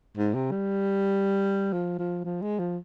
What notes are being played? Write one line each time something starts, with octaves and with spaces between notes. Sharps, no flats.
G#2
C3
G3
F3
F3
F3
G#3
F3